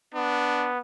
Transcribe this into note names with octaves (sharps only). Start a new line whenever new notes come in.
B3 D4